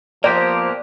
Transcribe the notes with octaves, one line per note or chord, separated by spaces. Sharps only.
F3 A#3 B3 G4 C5 D5 G5 A#5